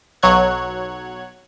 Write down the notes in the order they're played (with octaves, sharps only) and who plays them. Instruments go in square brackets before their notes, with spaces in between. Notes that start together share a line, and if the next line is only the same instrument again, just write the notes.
[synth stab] B1 F#3 C#5 F#6 G#6